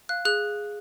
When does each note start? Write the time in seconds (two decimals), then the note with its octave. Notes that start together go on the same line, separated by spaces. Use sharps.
0.09 F5 F#6
0.25 G#4 F#6